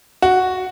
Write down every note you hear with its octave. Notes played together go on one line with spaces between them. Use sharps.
F#4